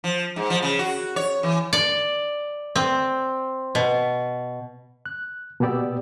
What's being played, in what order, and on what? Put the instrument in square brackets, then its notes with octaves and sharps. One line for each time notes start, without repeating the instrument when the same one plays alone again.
[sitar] F3
G#2
F3
C#3
F#4
C#5
E3
[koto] D5
C4
B2
[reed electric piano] F#6
B2 A#3 B3 G4 D5 E6